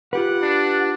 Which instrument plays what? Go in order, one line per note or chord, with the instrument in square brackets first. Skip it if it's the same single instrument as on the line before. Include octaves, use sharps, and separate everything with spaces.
[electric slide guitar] F4 G4 B4 [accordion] F#5 F#6
[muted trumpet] D4